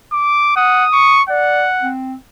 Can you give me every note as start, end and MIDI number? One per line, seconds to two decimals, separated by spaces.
0.13 0.55 86
0.56 0.85 78
0.56 1.17 87
0.93 1.22 85
1.30 1.65 74
1.30 1.92 78
1.82 2.14 60